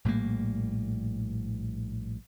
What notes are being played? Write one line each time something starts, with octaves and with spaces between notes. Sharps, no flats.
A#1 A2 G3 A#3